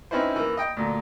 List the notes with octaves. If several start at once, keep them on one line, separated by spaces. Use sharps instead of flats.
C4 C#4 D#4 E4 B4 C5
E3 A#3
D#5 G5
D2 A#2